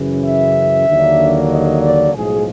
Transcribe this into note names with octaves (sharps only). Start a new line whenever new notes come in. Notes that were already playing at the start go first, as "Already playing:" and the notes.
Already playing: F#2 C#3 E3
E5
D#2 D3 F#3 A#3 D4
D#5
D5
B1 A2 F3 G#3 G#4